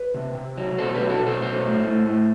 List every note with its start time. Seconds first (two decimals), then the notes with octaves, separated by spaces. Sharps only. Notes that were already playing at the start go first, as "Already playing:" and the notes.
Already playing: B4
0.14 C3
0.35 C3
0.57 F#3
0.78 B2 A4 C5
0.94 G4 B4
1.00 F#3
1.09 F#4 A4
1.20 B2
1.26 A4 C5
1.42 F#3 A4 C5
1.64 A2
1.85 A2
2.06 A2